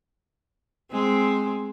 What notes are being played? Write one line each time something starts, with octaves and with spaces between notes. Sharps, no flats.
G#3 C4